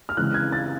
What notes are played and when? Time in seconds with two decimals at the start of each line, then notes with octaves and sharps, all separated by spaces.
0.09 F6
0.17 C#3 E3 G#3 C4 F#6
0.34 G#6
0.52 A6